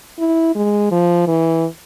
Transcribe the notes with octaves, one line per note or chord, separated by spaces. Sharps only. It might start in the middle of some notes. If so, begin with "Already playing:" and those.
E4
G#3
F3
E3